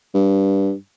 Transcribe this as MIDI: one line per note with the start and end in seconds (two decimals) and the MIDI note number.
0.14 0.73 43